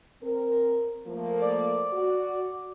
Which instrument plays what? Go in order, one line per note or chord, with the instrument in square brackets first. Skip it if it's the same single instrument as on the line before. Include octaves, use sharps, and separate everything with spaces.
[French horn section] C4 A#4
F3 A3 A#3
[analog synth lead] D5
[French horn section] F#4